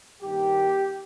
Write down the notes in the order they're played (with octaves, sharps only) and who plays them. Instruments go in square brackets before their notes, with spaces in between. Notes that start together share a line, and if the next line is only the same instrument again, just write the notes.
[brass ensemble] G2 D#3 A#3 G4